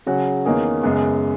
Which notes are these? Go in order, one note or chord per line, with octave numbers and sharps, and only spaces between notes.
C#3 F#3 C#4 F#4
E2 D#3 A#3 C#4 G#4
F#2 C#3 G#3 B3